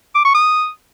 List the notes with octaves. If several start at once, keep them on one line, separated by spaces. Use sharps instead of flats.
D6
C#6
D#6